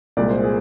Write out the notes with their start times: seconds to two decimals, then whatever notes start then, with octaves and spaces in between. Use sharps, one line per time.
0.17 C2 A#2 G#3 D5
0.30 C5
0.44 G#4